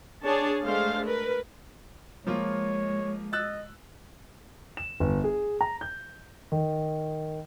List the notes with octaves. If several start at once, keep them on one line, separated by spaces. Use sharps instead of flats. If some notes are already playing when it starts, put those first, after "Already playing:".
D4 G#4 C#5 A5
G#3 A3 D4 C5 F5
A#4 B4
F3 G#3 A#3 F4 C#5
D#5 E6 F#6 A6
E7
G1
G#4
A#5
G6
D#3